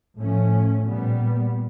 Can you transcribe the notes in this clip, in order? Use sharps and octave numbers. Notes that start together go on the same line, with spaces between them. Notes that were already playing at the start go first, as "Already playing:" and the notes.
A2 F3 A3 C#4
A#2 G3 B3